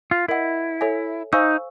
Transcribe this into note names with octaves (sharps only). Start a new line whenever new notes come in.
F4
E4 A#4 D#5 F#5
A4 C#5 E5 G#5
D#4 C5 F5 G#5 C#6 E6